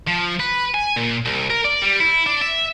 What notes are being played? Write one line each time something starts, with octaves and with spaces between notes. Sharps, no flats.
F3
B4
G#5
A#2
C2
A#4
D5
G3
E4
D4
E5